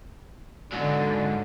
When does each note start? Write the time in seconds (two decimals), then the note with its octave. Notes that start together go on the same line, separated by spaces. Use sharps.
0.73 G#2 D3 F#3